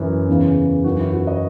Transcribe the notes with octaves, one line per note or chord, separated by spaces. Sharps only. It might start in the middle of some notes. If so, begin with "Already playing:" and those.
Already playing: F#2 E3
E2 C#3 E3
F#2 E3 F#4
E4
F#4
D#5